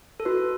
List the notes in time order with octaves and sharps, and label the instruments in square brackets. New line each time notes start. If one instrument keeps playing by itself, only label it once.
[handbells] A4
[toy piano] F#4 [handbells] B4